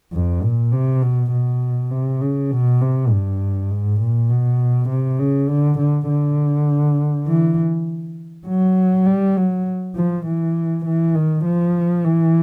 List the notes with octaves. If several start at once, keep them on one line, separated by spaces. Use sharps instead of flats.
F2
A#2
C3
B2
B2
C3
C#3
B2
C3
G2
G#2
A#2
B2
C3
C#3
D3
D3
D3
E3
F#3
G3
F#3
F3
E3
E3
D#3
F3
E3